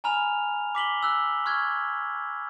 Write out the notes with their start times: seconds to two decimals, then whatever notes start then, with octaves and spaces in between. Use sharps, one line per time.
0.04 G#5 A#5 B5 F6 F7
0.75 D6 B6 F#7 G7
1.03 E6 F#6
1.46 C#6 F6 F#6 G#6